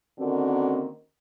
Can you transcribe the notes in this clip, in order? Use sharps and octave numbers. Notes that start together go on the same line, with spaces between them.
D3 D#3 A#3 C4 C#4 F#4